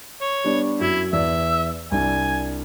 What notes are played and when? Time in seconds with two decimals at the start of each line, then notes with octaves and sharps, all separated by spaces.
0.21 C#5
0.44 G3 B3 D4
0.80 F#2 E4 F#4 G#6
1.13 E2 D5 E5
1.92 C2 D4 G#5